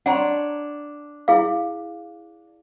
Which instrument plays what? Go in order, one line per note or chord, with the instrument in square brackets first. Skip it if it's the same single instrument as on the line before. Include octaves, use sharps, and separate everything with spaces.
[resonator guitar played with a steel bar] D4 C#5 [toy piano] F#5 A#5 C6
[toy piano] E4 G#4 F5